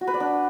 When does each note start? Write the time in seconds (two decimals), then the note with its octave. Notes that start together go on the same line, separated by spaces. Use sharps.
0.01 F#4
0.07 B4
0.14 D5
0.20 D4